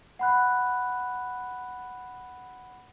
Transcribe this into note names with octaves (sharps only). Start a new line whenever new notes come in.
F#5 B5 F#6